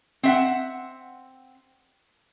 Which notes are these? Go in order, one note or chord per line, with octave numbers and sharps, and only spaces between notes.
C4 E5 F#5